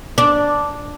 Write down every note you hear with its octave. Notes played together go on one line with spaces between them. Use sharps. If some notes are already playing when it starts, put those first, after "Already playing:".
D4